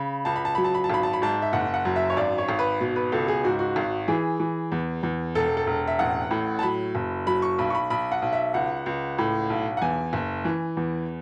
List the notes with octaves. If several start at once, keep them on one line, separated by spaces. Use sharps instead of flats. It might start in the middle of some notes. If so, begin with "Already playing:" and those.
Already playing: C#3 B5
C#2 A5
B5
A5
F#3 B5
A5
B5
A5
G#1 B5
A5
B5
G#2 A5
E5
F#1 F#5
F#5
F#2
E5
C#5
G#1 D5
C#5
G#1
B4
B2
B4
C#2 A4
G#4
G#2 F#4
F#4
G#1
E3 G#4
E3
E2
E2
E1 A4
A4
E1
E5
A1 F#5
A2
A5
F#3 B5
F#1
F#3 B5
C#6
B1 B5
C#6
B5
B1 B5
F#5
B1
E5
C#2 F#5
C#2
A2
B1
F#5
E2 G#5
F#1
E3
E2